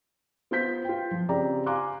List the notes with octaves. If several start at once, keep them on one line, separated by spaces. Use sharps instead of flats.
B3 F4 C5 G6 B6
F4 G5
F3
C#3 C4 G4 D5 G5 A#5
F5 G#5 A#5 C6 D6 F#6